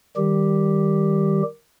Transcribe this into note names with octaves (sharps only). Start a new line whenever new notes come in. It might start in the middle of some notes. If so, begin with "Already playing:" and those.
D#3 G3 G4